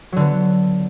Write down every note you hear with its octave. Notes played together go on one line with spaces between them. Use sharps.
D3 F#3 B3